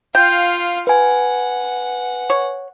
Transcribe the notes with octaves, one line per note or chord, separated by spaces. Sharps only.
F4 F5 G5
B4 F#5 G#5
C#5